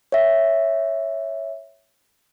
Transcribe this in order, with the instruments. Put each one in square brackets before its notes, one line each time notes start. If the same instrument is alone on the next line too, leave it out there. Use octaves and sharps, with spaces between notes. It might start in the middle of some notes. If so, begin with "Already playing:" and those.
[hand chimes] C#5 E5